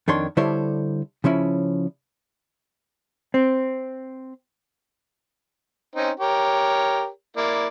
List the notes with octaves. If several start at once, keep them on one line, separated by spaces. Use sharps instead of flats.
F2 D#3 D4 C#5 C6
D3 G3 E4 A4 C5 C#5
C#3 F3 C#4 E4
C4
C4 C#4 D#4
G4 A#4 C#5
A#3 E4 D5